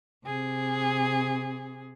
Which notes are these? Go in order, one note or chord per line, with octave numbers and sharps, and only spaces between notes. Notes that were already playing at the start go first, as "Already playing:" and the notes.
C3 G#4